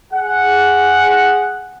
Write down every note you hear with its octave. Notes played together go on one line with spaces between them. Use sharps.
G#4 F#5